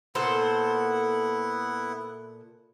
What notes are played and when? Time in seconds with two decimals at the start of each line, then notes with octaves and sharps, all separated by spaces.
0.15 A#2 B3 E4 A4 C5 F#5